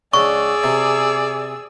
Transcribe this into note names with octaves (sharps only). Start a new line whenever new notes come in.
C#2 D4 G#4 D5 C#6 E6
C3